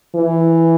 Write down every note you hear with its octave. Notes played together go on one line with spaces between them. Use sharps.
E3